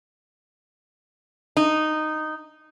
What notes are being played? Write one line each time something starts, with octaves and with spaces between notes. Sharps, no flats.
D#4